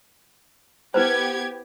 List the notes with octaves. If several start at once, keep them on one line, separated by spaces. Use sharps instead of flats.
B3 E4 G4 B4 C5 G#6